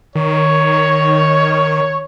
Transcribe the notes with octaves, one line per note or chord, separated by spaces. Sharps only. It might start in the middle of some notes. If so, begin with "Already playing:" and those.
D#3 C#5